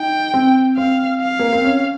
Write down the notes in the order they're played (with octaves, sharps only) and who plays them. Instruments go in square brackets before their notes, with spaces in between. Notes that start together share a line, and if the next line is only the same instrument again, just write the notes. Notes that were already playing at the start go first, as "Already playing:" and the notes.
Already playing: [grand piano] D#4 [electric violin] G5
[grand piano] C4
[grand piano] C4 [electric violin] F5
[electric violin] F5
[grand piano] A#3
C4
C#4